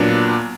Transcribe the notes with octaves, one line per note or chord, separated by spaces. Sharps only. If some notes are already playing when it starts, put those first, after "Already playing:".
Already playing: A#2 F#3 B3 D4